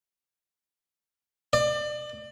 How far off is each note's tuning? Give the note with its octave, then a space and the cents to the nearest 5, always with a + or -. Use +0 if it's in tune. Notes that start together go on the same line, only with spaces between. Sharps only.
D5 +30